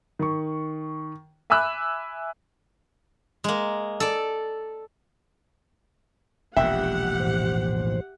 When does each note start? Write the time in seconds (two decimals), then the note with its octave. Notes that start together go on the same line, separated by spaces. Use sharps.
0.19 D#3 C#6
1.50 E5 G#5 B5 D6 E6 F#6
3.44 G#3 A#3
4.00 A4 D5
6.57 E1 A#1 G4 E5 F#5 G5
7.20 A2 E3 C5